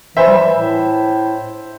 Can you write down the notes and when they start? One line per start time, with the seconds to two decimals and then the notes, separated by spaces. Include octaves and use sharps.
0.17 E3 C5 E5
0.27 G3
0.37 E3
0.56 A2